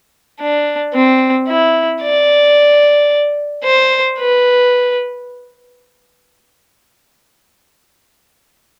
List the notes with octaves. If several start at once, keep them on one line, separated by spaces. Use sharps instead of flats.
D4
C4
E4
D5
C5
B4